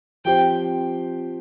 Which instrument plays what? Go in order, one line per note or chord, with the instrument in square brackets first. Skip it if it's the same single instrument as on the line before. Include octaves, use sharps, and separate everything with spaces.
[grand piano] F3 C4 G4 C5 [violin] G5